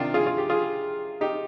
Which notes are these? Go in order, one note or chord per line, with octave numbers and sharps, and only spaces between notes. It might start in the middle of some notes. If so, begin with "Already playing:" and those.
Already playing: C3 D#3 D4 F4
F4 G#4
F4
G4
F4 G#4
D#4 G4